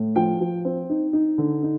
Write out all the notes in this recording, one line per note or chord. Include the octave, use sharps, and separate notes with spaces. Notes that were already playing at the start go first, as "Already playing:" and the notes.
Already playing: A2
F3 G5
F3
C4
D#4
D#4
D3
D#4